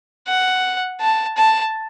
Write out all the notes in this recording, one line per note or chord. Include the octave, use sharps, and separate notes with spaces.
F#5
A5
A5